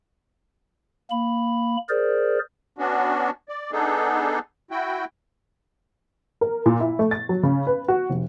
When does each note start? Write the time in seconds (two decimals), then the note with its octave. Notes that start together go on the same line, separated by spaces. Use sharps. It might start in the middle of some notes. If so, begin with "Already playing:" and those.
1.11 A#3 B5
1.89 G#4 A#4 C5 D5
2.78 B3 C#4 D4 F#4
3.49 D5
3.72 B3 D4 D#4 G#4 A4
4.71 E4 F#4 G5
6.41 A#4
6.66 A#2
6.80 E4
6.99 A3
7.11 A6
7.29 F#3
7.43 C#3
7.67 B4
7.88 F#4
8.10 F1